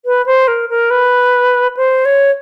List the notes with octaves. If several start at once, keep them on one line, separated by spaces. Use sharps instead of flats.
B4
C5
A#4
A#4
B4
C5
C#5